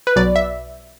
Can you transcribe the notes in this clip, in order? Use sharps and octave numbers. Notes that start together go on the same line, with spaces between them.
B4
B1 B2 F#3 D5
E5